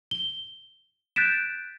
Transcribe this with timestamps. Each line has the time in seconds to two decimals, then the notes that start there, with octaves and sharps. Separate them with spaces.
0.11 G7
1.16 F#6 G6 A6 B6 D7 E7